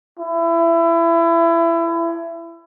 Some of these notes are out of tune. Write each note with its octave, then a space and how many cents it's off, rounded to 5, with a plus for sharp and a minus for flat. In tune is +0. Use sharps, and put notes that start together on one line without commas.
E4 +25